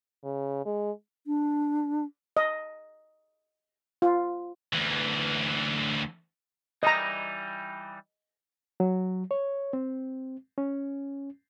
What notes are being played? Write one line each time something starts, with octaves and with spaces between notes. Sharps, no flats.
C#3
G#3
D4
D#5
F4
D2 E3
E3 G3 D#4 D#5 A#5
F#3
C#5
C4
C#4